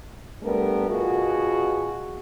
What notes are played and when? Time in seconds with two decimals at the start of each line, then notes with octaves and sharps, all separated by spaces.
0.43 G3 A3 B3 D4 A#4
0.90 B2 F4 F#4 G#4